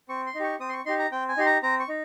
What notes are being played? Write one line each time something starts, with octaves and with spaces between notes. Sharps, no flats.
C4 C#6
C6
D#4
G4 C#6
C4 D#6
C6
C#6
D#4 G4 C6
A#5
C4 G5
G#5
D#4 G4 C6
A#5
C4 A#5
C#6
D#4